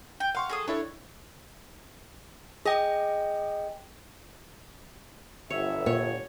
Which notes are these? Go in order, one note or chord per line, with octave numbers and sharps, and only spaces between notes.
G5
F5 F#5 C6 C#6
G#4 A4 D#6
D4 E4 A4 C#5
G#4 D#5 G5
G1 C#5 E5
A#2 C#5